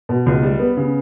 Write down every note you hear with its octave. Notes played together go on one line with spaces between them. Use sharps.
B2
C#2
G3
B3
C#3